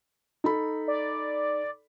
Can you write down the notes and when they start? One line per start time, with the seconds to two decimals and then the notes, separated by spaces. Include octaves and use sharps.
0.44 D#4 A4 B5
0.88 D5